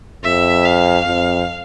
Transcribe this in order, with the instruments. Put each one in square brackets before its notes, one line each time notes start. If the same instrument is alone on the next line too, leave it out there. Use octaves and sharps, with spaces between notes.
[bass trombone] F2 [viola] E5
[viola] F5
[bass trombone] F2